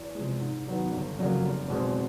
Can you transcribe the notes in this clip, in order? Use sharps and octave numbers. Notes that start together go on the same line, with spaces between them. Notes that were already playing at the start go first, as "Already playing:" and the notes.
Already playing: E2
C3 F3 G#3
G#2
D#3 F#3 B3
G1
F2 C#3 F#3 A#3
F1
E2 B2 G#3 C4